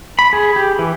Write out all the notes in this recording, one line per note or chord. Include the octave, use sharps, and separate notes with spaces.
B5
G#4
G4
E3